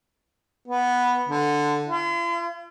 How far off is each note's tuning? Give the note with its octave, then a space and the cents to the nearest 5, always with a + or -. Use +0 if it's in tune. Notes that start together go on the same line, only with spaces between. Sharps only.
B3 -5
D3 +0
F4 -45